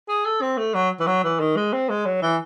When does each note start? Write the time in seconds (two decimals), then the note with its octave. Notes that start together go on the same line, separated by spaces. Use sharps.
0.08 G#4
0.25 A4
0.42 C4
0.58 A3
0.75 F#3
1.00 E3
1.07 F#3
1.24 E3
1.40 D#3
1.56 G#3
1.73 C4
1.90 G#3
2.06 F#3
2.22 E3